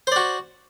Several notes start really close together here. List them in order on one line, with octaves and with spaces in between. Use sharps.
C5 D5 F#4